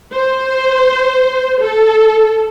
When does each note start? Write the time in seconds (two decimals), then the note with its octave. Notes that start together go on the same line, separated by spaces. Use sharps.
0.14 C5
1.61 A4